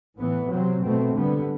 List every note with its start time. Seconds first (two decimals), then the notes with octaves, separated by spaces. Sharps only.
0.18 A2 E3 B3
0.51 C3 F#3 C4
0.83 B2 A3 C4
1.15 D3 G3 B3